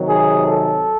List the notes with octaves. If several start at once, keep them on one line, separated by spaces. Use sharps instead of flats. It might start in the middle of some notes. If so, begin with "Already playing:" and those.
Already playing: C3 D#3 F#3
G#4
A4